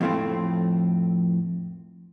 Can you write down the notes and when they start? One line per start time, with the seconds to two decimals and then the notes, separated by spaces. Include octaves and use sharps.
0.01 F2 A2 F3 A3 C4